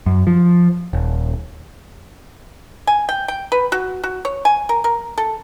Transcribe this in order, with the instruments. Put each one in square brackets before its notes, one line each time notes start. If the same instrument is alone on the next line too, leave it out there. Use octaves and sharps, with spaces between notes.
[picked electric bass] F#2
F3
D#1
[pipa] G#5
G5
G5
B4
F#4
F#4
C#5
G#5
A#4
A#4
A4